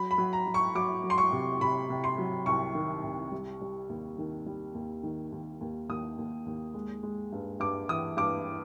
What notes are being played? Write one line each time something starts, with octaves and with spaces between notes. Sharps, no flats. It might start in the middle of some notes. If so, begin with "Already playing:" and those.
Already playing: F#3 B5
B5
F#3
A#5
F#3
C#6
F#3 D6
F#3
C6
C#6
C3
C3 B5
C3
C6
F#3
C2 C#6
D#3
C2
G3
G3
D#2
D#3
G3
D#2
D#3
D#2
D#2
D#2 D#6
D#2
D#2
G#3
G#3
G2
G2 D6
E3 D#6
G2 D6